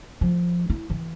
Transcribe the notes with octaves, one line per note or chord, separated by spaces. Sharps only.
F3
E4
E3